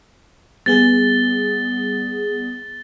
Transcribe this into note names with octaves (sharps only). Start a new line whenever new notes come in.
G3 B3 G#4 A6 G7